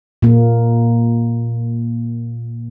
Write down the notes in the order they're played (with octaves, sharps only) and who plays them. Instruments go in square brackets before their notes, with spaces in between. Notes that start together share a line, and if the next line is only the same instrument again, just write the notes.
[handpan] A#2 A#3